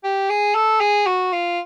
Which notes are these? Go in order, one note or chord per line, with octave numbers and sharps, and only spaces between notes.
G4
G#4
A4
G#4
F#4
F4